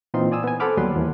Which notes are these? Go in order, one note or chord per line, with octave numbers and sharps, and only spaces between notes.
A#2 E3 C4 D#4 F4 C6
D5 G#5 D#6 E6
B3 G#5
A4 C5 F#5 B5 D6 F6
D#2 F#3 G3 B3 B4 C6
D#2 E3